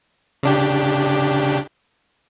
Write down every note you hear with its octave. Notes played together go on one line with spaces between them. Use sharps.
C#3 D4 G4